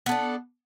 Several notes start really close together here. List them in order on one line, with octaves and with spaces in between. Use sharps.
B3 A4 D4